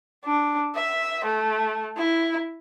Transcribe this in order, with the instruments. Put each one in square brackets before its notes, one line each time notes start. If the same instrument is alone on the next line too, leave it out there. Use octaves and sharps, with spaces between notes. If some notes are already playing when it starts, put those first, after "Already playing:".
[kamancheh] D4
E5
A3
E4